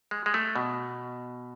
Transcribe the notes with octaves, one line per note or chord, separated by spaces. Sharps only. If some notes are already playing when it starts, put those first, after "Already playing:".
G#3
G#3
A3
B2